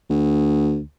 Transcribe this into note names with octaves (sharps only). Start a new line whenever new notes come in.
D2